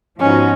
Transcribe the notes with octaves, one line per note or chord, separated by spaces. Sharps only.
G#2 F3 B3 C#4 D#4 F#4